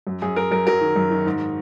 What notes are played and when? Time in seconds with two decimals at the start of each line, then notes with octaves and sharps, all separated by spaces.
0.07 F#2
0.22 F#2 G#4
0.36 F#2 A#4
0.51 F#2 A#4
0.67 F#3 A#4
0.81 D#3
0.96 F#2
1.11 D#3
1.25 G#2